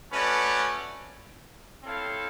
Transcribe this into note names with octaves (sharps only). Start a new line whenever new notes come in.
A3 C#4 F#4 B4 D5
C4 E4 A4 C#5 F5